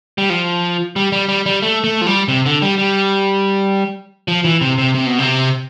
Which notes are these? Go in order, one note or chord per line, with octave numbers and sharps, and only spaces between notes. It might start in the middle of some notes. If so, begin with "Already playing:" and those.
G3
F3
G3
G3
G3
G3
A3
A3
F3
G3
C3
D3
G3
G3
F3
E3
C3
C3
C3
B2
C3